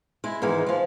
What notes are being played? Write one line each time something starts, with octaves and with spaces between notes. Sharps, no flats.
G#3 E4
G#2 D#3 E3 G#3
F3 G#3